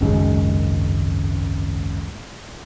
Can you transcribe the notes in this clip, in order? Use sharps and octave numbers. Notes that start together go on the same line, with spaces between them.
G#1 C#2 F#2 G#3